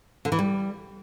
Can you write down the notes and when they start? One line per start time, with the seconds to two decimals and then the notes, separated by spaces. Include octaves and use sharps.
0.25 D3
0.32 E3
0.39 G3